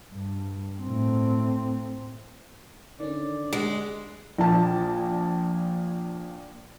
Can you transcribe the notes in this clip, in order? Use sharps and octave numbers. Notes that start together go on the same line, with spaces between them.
G2
A2 C4
D3 D#3 C#4 D5
G#3 F#5
A#1 A#2 A5